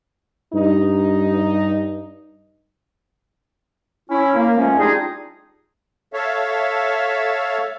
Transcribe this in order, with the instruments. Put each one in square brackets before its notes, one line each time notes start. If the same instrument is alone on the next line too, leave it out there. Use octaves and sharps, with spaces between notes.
[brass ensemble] G2 D#4
[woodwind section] C#4 E4
A#3
F2 F3 G#3 A3 C#4
G3 D4 D#4 F4 G#4
[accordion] A4 C#5 E5 F5